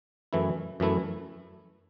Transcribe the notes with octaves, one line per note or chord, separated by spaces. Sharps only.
F#2 E3 A3 E4
F#2 E3 A3 E4